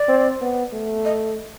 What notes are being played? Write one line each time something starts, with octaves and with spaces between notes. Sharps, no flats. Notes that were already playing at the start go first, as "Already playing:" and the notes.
Already playing: D5
C4
B3
A3
D#5